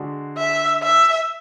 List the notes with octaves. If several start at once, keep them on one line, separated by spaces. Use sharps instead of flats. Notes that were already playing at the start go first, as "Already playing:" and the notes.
Already playing: D3 G#3 D4 F#4
E5
E5